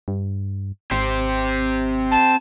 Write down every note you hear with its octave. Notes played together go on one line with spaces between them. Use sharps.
G2
G#1 C4 G4 C5
A5